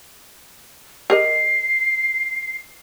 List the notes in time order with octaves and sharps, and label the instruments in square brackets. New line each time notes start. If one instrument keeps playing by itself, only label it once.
[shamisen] G4 A#4 D#5 [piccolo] C7